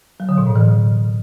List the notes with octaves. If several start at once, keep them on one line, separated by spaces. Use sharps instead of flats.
F#3
D3
B2
A2
E3